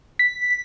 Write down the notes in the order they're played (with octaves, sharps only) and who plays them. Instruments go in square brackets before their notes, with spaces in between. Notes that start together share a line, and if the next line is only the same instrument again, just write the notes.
[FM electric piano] B6